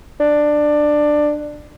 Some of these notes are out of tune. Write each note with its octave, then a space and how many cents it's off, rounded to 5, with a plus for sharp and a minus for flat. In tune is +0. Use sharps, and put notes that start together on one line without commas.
D4 +15